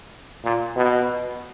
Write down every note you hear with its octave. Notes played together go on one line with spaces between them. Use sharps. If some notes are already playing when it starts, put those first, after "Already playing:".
A#2
B2